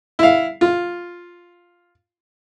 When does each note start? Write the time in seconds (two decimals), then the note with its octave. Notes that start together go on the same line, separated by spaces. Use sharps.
0.19 E4 F5
0.61 F4